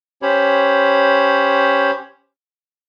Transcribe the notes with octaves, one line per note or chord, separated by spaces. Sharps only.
C#4 G4 C5 C#5 B5